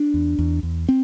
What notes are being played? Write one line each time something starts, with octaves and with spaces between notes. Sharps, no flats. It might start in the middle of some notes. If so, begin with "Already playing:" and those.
Already playing: D4
E2
E2
E2
C4